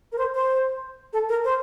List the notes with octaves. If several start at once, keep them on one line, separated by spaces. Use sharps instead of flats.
A#4
C5
C5
A4
A#4
C5